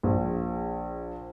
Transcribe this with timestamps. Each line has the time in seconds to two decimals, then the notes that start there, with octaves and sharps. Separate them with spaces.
0.03 A#1